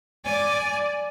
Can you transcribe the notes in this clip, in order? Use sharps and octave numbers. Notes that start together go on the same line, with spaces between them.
D5 G#5